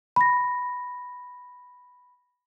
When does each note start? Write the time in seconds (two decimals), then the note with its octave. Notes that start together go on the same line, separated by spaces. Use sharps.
0.16 B5 A#6